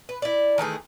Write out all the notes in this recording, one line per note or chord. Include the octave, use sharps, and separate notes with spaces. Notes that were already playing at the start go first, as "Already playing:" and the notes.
B4
E4 D5
D#3 E3 A3 G#4